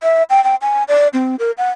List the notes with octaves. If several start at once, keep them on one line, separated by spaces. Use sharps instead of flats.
E5
G5
G5
G#5
D5
C4
A#4
F#5